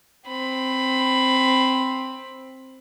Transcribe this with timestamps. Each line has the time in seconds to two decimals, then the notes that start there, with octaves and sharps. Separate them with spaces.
0.28 C4 B5